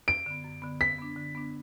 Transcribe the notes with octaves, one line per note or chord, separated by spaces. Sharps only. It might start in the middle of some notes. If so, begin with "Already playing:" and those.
F#2 D7
D3 B3
F#2
D3 B3
D3 B6
B3 D4
D3
B3 D4